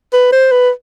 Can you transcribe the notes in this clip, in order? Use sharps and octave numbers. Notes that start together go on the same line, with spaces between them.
B4
C5
B4